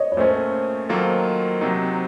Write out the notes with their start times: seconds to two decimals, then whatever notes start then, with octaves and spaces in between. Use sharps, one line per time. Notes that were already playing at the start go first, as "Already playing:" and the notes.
Already playing: C#5 D#5
0.12 C#5
0.17 A#2 A3 C#4 C5
0.89 D#3 F#3 A#3 F4 A4
1.61 C3 F#3 C4 D#4